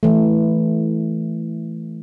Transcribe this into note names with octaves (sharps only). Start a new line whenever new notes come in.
E3 A3